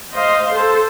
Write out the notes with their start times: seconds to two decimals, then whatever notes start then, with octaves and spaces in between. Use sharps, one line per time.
0.14 C5 D#5 F5 C6
0.53 A4 C5